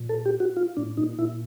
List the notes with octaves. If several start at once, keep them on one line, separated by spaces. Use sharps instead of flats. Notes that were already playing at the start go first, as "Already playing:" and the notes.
Already playing: A#2
A4
G4
F#4
F4
A2 D4
A#2 D#4
A#2 E4